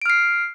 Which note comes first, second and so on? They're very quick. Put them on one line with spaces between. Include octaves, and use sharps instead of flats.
D7 F6 C7